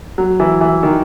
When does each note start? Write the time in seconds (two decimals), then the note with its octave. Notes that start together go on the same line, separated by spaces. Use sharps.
0.18 F#3
0.40 E3
0.61 E3
0.83 D#3